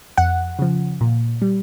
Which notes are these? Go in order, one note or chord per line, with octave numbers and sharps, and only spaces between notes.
F2 F#5
C#3 F3
A#2
G3